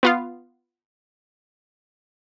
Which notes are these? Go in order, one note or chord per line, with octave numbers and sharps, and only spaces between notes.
B3 F4 F5